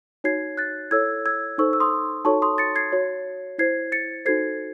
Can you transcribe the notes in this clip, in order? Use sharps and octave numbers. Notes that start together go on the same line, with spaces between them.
D#4 F#4 C#5 G#6 C7
F#6 A6
E4 A4 C#5 E6 G#6
E6 G#6
D#4 A4 C5 C#6 E6
E6
C6 D#6
D#4 F#4 A4 C#5 A5 C#6
C6 D#6
A6 C#7
G#6 C7
F#4 C#5
E4 C5 G#6 C7
A6 C#7
D#4 F#4 A4 C5 G#6 C7